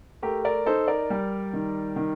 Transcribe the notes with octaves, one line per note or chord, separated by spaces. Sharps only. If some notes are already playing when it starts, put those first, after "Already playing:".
A3 G4 A#4
A#4 D5
D#4 A4 C5
A#4 D5
G3
D#3
D#3